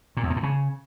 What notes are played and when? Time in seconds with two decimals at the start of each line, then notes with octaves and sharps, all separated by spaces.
0.17 A#2
0.23 E2
0.30 A#2
0.36 A2
0.43 C#3